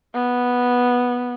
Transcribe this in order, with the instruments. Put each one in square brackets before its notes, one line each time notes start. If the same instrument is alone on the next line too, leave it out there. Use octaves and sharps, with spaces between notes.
[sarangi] B3